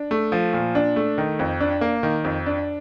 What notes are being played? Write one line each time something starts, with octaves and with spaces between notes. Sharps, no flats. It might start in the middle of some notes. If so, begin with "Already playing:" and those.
Already playing: D4
A3
F3
A#2
D4
A3
D#3
F2
D4
A#3
D#3
F2
D4